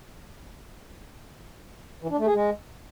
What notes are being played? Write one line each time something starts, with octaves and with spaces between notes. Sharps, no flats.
E3
D4
A3
G#4
G#3